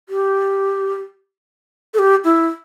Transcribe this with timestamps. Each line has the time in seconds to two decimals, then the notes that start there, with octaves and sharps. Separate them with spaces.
0.09 G4
1.94 A4
1.99 G4
2.24 E4